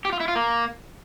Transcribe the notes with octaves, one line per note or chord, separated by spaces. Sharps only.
G4
F4
E4
F4
A#3